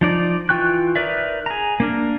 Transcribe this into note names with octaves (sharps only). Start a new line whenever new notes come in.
F3 D#4 D5
E3 F4 G5 C#6 F#6
D#4 A#4 B4 D5 E5
G#4 A#5
A#3 D4 A#4